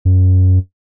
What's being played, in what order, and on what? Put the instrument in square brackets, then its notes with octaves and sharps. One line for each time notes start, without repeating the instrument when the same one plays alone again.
[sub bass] F#2